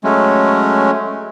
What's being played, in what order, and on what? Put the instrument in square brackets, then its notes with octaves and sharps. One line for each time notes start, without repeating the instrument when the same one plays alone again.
[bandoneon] F#3 G#3 A3 C#4